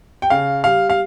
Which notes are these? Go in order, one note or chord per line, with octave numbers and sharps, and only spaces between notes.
G5
C#3 F5
G3 F5
F5